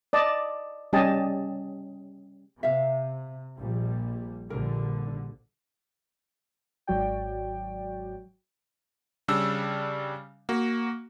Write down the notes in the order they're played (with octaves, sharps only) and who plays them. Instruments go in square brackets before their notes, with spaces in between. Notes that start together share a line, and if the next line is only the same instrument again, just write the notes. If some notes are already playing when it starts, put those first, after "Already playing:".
[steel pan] D5 D#5 A5
G3 C#4 G4 D#5 G#5 A5
[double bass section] C3 [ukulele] E5 F5
[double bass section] A#1 G3
[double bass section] A#1 D3 G3 [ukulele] A#4
[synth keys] G#1 F#3 F#4 D5 G5
[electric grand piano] C#3 G3 D4 E6
A#3 F#4